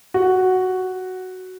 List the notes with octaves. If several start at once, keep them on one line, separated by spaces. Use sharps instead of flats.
F#4